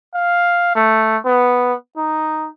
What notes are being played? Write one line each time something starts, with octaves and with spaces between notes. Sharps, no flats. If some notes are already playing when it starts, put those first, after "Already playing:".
F5
A3
B3
D#4